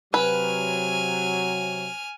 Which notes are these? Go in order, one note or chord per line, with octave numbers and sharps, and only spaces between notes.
C3 F#3 B4 G#5 F6